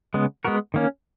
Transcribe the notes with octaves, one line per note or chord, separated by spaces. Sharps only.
C#3 G#3 B3
G#3 B3 F#4 A#4
D#3 A#3 C#4